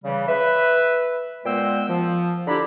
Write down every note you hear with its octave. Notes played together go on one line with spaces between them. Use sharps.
C#3 E3 G3
B4 E5
A#2 G#3 B3 C5 G5 E6
F3
D3 D4 E4 G4 A#5 B5